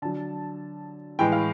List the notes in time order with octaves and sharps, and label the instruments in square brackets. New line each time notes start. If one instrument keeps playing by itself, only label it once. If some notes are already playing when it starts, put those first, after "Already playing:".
[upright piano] D3 F#3 A5
A2 E3 G#3 G5
F5